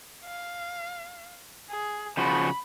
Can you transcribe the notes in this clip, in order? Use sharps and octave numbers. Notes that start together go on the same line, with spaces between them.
F5
G#4
C#3 F3 F#4 B5